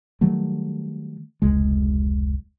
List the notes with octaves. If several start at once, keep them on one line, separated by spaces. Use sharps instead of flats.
D#3 F#3 G3 A3
F1 C#2 G#3